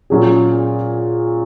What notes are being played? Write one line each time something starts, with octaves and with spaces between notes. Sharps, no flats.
A#2 F#3 C#4 G#4